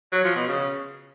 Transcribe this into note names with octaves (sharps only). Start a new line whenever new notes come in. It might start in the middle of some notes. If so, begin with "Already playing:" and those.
F#3
F3
B2
C#3